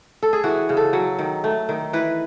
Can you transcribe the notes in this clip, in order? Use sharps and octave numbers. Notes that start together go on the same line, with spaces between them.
A4
G#4
E3 F#4
C#3
A4
F#3
D#3
A3
D#3
E3 B4